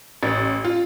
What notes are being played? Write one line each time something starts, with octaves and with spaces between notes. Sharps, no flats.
A1
F4